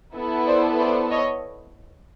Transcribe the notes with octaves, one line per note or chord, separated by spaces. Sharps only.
B3 E4 A4
C5 D5
C5 D5
C#5 D#5